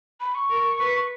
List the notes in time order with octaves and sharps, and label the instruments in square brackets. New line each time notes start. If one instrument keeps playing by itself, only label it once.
[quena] B5
C#6
[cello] A#4
B4